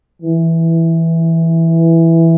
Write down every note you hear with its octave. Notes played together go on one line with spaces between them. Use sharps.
E3